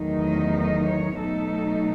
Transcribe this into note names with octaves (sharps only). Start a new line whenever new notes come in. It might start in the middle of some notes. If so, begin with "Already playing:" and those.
Already playing: E2 D#3 F#3 A3 D#4
D#5
D#5
C#5
B2 F#3 A3 D#4 A4